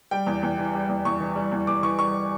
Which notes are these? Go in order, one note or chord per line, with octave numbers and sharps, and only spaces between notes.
G3 G5
E2
E2
E3
G3
E2
E2 C#6
E3
G3
E2
E2 D6
E3 C#6
G3 C#6